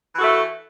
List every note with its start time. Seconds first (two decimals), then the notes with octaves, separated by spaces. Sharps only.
0.15 E3
0.18 F#4
0.21 A4
0.24 A3